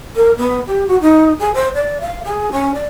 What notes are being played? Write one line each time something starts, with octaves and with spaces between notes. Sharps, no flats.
A#4
B3
G4
F#4
D#4
G#4
C5
D5
F5
G#4
C#4
D5